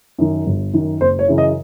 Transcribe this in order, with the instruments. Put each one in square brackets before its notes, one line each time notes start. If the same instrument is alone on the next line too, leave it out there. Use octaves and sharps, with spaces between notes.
[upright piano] F#2 D#3
G1
F#2 D#3
F#1 C5
C#5
F#2 C#3 E3
D#5